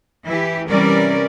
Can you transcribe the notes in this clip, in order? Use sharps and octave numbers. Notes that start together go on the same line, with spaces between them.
E3 E4 G4
C3 E3 G3 C#4 A#4 D5